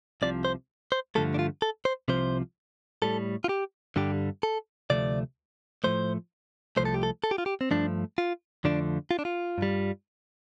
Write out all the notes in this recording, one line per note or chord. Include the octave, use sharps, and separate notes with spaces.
C2 C3 F3 D5
C5
C5
G2 D3 F3 A3 A4
D4
F4
A4
C5
C2 C3 F3 C5
A2 G3 A4
F4
G4
G2 D3 G3 G4
A4
D2 C3 F3 A3 D5
A2 F3 A3 C5
C2 C3 F3 A3 C5
A4
G4
A4
A4
G4
F4
G4
C4
G2 F3 A3 D4
F4
F2 D3 F3 A3 D4
F4
D4
F4
G2 G3